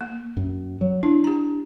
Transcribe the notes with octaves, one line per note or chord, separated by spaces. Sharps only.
A#3
F#2
F#3
D4 E4
G4 A#5